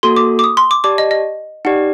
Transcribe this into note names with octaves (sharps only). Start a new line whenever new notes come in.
A#3 F#4 A4 C6
D6
D6
D#6
C6
D6
G4 D5 A5 D6
D#5
D#5
D#4 G4 D5 F#5